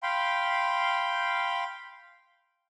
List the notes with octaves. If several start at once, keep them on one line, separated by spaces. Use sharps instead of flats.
F5 G5 B5 C6